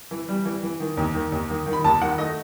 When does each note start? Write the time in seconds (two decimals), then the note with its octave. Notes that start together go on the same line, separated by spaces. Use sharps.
0.11 E3
0.28 G3
0.45 E3
0.63 E3
0.80 D#3
0.97 D#2
1.15 D#3
1.32 D#2
1.50 D#3
1.66 D#3
1.73 B5
1.84 D#2 A5
2.02 D#3 F#5
2.18 A3 D#5